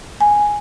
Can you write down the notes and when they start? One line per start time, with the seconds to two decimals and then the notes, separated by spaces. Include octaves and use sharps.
0.21 G#5